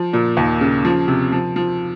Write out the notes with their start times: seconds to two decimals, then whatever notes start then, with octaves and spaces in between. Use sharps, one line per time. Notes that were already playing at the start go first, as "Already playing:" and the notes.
Already playing: F3
0.13 A#2
0.37 D#2
0.61 C#3
0.85 F3
1.08 C3
1.32 F3
1.56 F3